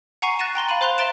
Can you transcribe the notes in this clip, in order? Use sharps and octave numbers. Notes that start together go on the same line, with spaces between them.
F#5 G#5 A#5 C#6 C7 D#7
F#6 A6 A#6 D#7 E7
G5 A#5 C6 A6
F5 A#5 B5 D#7 F#7
C5 F5 C6 F#6 F7
E5 A#5 C6 A6 D7 E7